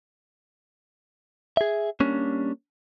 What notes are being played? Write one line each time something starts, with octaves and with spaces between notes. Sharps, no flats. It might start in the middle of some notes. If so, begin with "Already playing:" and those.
G#4 E5
G3 A#3 C#4 D4